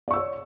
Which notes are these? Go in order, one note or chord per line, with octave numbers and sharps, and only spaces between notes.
C#5 D5 C#6 E6